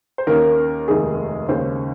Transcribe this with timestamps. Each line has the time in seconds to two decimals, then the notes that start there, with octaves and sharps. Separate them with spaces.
0.18 C5
0.27 D#2 D#3 A#3 C#4 A#4
0.88 F1 D#2 D#3 G#3 G#4
1.49 D#2 C#3 G#3 C#4 C5